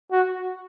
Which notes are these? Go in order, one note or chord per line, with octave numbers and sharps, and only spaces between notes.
F#4